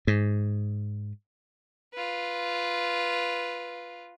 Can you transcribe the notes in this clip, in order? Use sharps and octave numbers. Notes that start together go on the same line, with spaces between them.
G#2
F4 B4